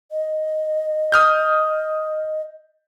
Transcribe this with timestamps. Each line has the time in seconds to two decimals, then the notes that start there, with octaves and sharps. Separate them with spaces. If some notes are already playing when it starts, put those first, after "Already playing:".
0.12 D#5
1.12 D#6 F6 G6